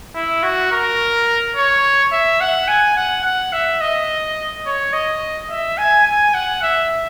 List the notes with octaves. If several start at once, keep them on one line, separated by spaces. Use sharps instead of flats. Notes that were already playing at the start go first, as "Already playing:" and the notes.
E4
F#4
A#4
C#5
E5
F#5
G#5
F#5
F#5
E5
D#5
C#5
D#5
E5
G#5
G#5
F#5
E5